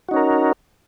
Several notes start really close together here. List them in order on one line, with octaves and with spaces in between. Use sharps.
F#4 D#4 C#4 A#4